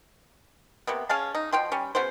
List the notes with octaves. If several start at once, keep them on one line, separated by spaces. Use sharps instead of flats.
C3 A#3 B3
C#4 G#4 F5 A5
D#4
B2 F3 G5 C6
G3 C#4
C#3 B3 F#4 C5